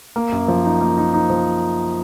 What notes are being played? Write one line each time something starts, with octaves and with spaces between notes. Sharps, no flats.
A#3
F#2
F3
D#4
A#3
D#4
D#4
F3